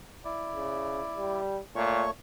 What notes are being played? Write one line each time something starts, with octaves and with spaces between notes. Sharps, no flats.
E4 D5
C#3
G3
A#2 A3 C#5 C#6